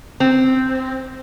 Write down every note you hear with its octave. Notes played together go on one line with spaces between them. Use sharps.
C4